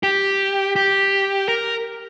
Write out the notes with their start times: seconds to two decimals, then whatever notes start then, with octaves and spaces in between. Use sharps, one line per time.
0.03 G4
0.76 G4
1.49 A#4